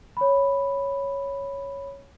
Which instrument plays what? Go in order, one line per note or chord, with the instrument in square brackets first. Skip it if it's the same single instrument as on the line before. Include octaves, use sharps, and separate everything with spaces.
[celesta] C#5 B5